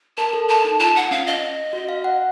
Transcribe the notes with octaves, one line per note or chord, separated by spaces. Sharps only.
A#4 A5
A4
A5
D#4
F4 A5
F#5
C#4 F5
D#5
F#4
F5
F#5